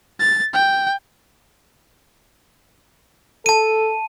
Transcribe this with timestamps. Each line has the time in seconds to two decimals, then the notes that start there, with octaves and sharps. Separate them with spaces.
0.20 A6
0.54 G5
3.46 A4 A5 D#7